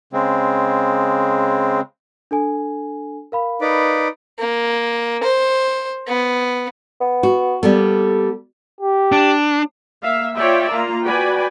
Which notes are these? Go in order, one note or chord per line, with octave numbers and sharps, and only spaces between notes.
C#3 G#3 C4
D4 A4 G#5
A#4 F5 B5
D#4 B4 D5
A#3
C5
B3
B3
F#4
G3 A#3 B3 A4
G4
D4
A#3 E5 F5
F4 C#5 D5 E5 G5
A#3 F4 A#5
F#4 B4 D5 G5 G#5 B5